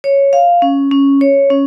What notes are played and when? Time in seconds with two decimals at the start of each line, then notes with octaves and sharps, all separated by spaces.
0.04 C#5
0.33 F5
0.62 C#4
0.91 C#4
1.21 C#5
1.50 C#4